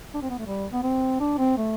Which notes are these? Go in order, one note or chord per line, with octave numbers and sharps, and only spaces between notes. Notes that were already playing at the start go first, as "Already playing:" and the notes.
D4
C4
B3
A3
G3
B3
C4
D4
C4
A3